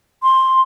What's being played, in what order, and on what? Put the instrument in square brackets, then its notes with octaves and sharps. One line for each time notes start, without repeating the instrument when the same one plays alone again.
[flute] C6